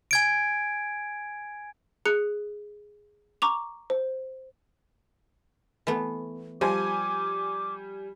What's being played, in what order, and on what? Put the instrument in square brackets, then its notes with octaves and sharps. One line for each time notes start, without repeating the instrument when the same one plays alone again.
[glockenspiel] G#5 G#6 D7
[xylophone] G#4 F#6 C#7
A#5 C#6 D6 F7
C5
[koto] E3 A3 B3
[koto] F3 [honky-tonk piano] G3 G#5 [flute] D6